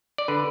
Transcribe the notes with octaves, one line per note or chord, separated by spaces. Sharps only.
D5
D3 B4